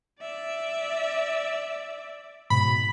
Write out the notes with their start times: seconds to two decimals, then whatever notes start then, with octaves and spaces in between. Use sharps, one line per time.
0.21 D5 E5
2.50 G#2 B2 B5